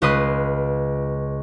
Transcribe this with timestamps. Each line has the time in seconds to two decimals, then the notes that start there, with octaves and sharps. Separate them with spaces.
0.02 C#2 F4 B4 D#6 C7